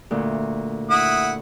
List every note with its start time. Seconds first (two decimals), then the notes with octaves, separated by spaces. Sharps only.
0.11 D2 A#2
0.90 E4 F#5 D#6